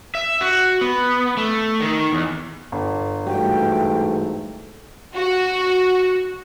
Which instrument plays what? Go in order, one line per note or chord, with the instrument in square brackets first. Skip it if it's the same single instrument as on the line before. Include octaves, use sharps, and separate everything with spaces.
[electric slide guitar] E5
F#4
B3
A3
D#3
E2
[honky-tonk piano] G1
[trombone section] G#2 E3 A3 [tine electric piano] G3 F#4 [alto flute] G5
[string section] F#4